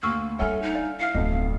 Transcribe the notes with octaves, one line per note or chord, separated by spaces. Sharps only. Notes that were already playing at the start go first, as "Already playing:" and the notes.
D2 A#3 C#6 E6 F6
G3 D4 A4 C#5 E5 F#5 G#5 F6
D#4
D5 F5
E4 F5 F6 C7 C#7
D1 B1 F2 A4 D#5